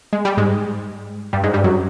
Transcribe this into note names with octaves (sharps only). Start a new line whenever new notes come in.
G#3
G3
G#2 G#3
G2 G3
G#2 G#3
G2 G3
F#2 F#3